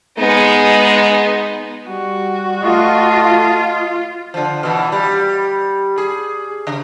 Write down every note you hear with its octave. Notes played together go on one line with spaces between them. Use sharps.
G#3 B3 D#4
G3 F#4
A3 F4 D#5 A5
D3 F3
B2 E3
G3
G#4
C#3